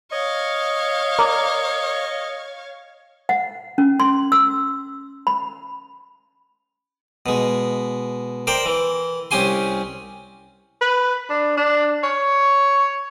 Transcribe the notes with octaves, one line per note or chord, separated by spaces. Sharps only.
C#5 D#5 F5
A#4 D5
F#5
C#4
C6
E6
B5
B2 G#3
A#4 C5 D5 G5
E3
C2 C#4 G4 G#5 C6
B4
D4
D4
C#5